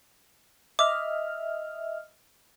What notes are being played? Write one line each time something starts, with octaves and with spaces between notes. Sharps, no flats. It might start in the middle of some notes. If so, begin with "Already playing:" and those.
D#5 E5 D6 F6